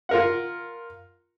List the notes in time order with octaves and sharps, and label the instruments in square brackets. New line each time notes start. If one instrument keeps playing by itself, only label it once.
[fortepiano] F4 A#4 F#5